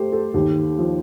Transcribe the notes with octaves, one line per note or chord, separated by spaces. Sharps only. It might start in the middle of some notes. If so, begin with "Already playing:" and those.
Already playing: A3 G4 C5
A4
D#2 G4
F3